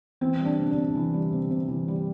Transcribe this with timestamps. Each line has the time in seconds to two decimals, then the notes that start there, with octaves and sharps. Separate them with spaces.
0.21 E3 C4
0.40 G3
0.45 D4
0.59 C3
0.71 D4
0.76 C3
0.95 E3
1.14 G3
1.33 C3
1.51 C3
1.68 E3
1.88 G3